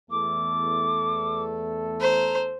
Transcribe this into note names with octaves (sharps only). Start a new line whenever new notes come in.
E2 A3 A4 D6
C5 A#5